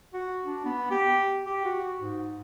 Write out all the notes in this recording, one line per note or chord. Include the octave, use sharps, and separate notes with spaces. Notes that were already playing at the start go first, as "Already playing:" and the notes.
F#4
D4
B3
G4
G4
F#4
G#2